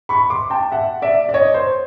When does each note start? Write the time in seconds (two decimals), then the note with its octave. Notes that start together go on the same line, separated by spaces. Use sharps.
0.09 B5 C#6
0.30 C6 D6
0.50 G5 A5
0.71 E5 F#5
1.02 D5 E5
1.29 D5
1.34 C#5 D#5
1.54 C5